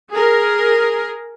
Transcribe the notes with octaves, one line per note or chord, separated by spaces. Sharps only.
G#4 A#4